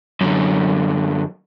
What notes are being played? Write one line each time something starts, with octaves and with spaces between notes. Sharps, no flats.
F#2 D3